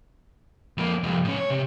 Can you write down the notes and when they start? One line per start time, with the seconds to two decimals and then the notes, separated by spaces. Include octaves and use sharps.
0.78 F2 A#3
1.04 C2 F2
1.24 A2 C#4
1.37 C#5
1.50 C3